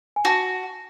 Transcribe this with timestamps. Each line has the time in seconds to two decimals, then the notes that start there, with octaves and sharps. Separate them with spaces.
0.16 G#5
0.25 F#4 A5